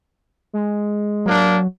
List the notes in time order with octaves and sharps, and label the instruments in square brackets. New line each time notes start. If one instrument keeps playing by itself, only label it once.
[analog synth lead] G#3
[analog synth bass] F#3 [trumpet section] A#3 D4